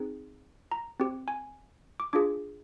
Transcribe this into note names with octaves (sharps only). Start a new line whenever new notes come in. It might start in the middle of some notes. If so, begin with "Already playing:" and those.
Already playing: C4 D#4 G#4
A#5
C4 G4
G#5
D6
D4 F4 G#4 D6